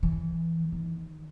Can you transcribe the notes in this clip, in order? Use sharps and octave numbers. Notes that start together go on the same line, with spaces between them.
E3
D#3